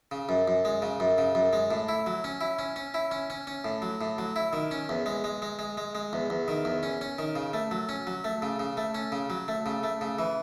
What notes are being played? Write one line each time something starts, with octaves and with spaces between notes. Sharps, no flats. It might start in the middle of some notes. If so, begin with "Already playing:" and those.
C#3
F#2
F#2
G#3
C#3
F#2
C#3
F#2
G#3
A2
E4
F#3
C#4
E4
C#4
C#4
E4
C#4
C#4
C#4
A2
F#3
A2
F#3
E4
D#3
C#4
E2
G#3
G#3
G#3
G#3
G#3
G#3
E2
E2
D#3
E2
C#4
C#4
D#3
C#3
A3
F#3
C#4
F#3
A3
C#3
C#3
A3
C#4
C#3
F#3
A3
C#3
A3
C#3
E3